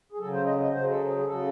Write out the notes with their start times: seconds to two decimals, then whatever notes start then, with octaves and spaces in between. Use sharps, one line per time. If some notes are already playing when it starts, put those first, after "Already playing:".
0.12 G#4
0.19 C#3 F#3 A4
0.33 C5
0.45 D#5
0.59 D#5
0.72 C#3 F#3 C5
0.90 A4
1.07 G#4
1.18 G#4
1.25 C#3 F#3 A4